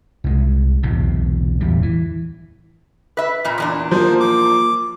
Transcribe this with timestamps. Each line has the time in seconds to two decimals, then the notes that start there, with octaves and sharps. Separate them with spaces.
0.24 C2 G#3
0.83 B1 E2 A2 C3
1.61 D1 E2 G3
1.82 E3
3.17 B4 E5
3.45 F2 A#2
3.58 E2 A#2 D4
3.91 F3 A#3 C5
4.20 D6